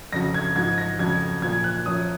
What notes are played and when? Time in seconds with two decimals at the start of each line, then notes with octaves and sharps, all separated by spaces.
0.13 F2 C#3 F#3 A#6
0.34 G#6
0.56 G#2 F3 G#6
0.78 A#6
0.99 F2 C#3 F#3 G#6
1.42 A#2 F3 G#6
1.64 F#6
1.86 F#2 F3 D#6